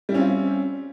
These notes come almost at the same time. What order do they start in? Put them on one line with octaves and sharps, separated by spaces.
G3 E4 C#4 C4 F4